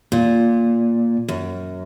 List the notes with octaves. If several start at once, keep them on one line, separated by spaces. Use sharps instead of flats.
A#2
F#2